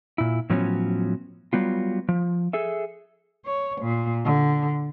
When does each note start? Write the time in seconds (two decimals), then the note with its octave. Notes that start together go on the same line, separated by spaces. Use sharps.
0.18 A#2 E4
0.50 A2 F3 F#3 B3 C#4
1.53 F#3 G3 B3 F4
2.09 F3
2.53 G#4 A4 E5
3.46 C#5
3.82 A#2
4.25 D3